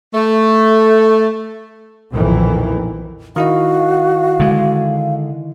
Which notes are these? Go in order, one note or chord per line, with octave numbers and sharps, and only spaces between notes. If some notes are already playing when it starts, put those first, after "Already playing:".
A3
B1 F2 A#2 D#3 E3
D#3 E4 F#4 D#5 F5
D3 G#3